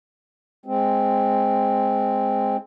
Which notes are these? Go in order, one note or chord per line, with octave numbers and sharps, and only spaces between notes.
G#3 C4